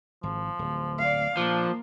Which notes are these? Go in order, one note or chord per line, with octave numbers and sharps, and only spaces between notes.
G#1 F3
D1
D5 F5
A#2 F3 A#3 D4